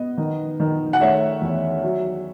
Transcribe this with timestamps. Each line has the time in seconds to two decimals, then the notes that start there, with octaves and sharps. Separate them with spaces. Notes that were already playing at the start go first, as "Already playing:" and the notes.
Already playing: B3 D#5
0.18 D#3
0.60 D#3
0.93 F#5
1.01 A3 C#5 E5
1.41 E2
1.83 F#3